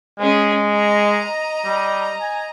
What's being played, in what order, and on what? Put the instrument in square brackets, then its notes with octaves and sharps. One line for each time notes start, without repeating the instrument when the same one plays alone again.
[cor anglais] G#3 [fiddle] C#4 G#4
[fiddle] D#5 A#5
[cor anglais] G3
G#5